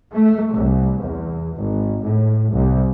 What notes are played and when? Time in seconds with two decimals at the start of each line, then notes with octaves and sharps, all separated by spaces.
0.13 A3
0.53 C2
1.02 E2
1.56 G#1
2.03 A2
2.52 C2